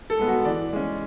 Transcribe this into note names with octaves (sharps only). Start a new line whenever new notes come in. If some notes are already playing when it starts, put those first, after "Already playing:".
A4
G#3 B3
F#4
E3 D5
G#3 C#4